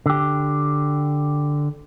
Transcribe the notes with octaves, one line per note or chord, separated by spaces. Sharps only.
D3 G4